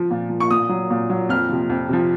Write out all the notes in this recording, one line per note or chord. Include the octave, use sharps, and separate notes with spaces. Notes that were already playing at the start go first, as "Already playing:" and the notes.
Already playing: F3
A#2
F3
C#6
A#2 D#6
F#3
A#2
F#3
F2 F6
C3 F3
F2
C3 F3